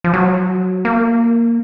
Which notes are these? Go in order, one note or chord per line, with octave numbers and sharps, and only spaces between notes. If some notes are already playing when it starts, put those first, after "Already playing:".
F3
F#3
A#3